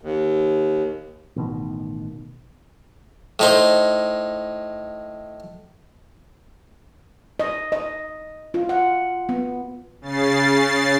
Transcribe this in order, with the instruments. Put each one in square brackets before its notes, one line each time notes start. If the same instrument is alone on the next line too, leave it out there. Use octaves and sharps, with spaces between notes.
[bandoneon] D#2
[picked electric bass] A1 B2 D#3
[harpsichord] A2 D#4 C5
[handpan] D#5
D#5
F4
F#5
B3
[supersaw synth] C#3 A6 C7